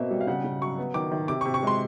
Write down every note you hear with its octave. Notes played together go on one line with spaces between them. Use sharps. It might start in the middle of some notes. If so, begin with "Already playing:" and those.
Already playing: B2 A#3 C4 E5
G3
F5
C#3 F#5
C#3
F#3 C#6
B3
D#3 D6
D#3
C3 D6
C#6
C3
C#6
G#3 C6